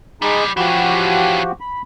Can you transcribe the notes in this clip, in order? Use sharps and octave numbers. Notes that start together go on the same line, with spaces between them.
E3 G3 G#3 D#4
E3 F3 C#4 F#4 G4
B5